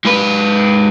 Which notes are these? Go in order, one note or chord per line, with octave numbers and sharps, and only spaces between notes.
G#2 B4